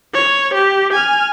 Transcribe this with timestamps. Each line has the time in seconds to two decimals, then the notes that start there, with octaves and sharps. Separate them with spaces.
0.14 C#5
0.54 G4
0.93 G#5 F6